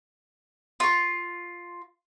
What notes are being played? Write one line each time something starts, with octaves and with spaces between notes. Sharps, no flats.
F4 C#6